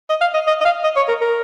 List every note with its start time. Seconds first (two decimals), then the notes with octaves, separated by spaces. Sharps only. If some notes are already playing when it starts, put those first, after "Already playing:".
0.09 D#5
0.21 F5
0.34 D#5
0.47 D#5
0.61 D#5
0.65 F5
0.83 D#5
0.96 C#5
1.08 A#4
1.21 A#4